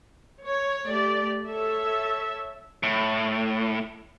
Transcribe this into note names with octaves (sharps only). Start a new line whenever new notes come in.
C#5
A3 G4 D5
A4 C#5 E5
A2